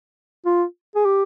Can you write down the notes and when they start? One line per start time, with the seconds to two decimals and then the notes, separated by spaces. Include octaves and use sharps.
0.46 F4
0.95 G#4
1.06 G4